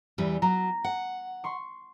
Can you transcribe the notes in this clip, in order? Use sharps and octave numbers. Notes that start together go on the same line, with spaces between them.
E2 E3 G3
F#3 A#5
F#5
C6 C#6